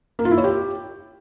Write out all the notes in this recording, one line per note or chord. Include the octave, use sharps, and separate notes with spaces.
A#3
F4
E4
C#5
G4